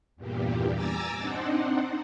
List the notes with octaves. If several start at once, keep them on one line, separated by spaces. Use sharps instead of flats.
E2 G2 A#2 G3
G#5 A#5 D6 E6 A6
C4 D4 D#4 C5 F#5